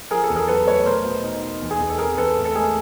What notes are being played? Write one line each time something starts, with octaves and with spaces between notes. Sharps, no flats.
F3 G#4 A#4
A4
E2
G#4 A#4
F#3 A4 B4
A3 B4 C#5
B2 A#4 C5
B2
D#4
D#4
E2
G#4
E2
A4
C4 G#4 A#4
E2 A4 B4
A2
A4
G#3 G#4 A#4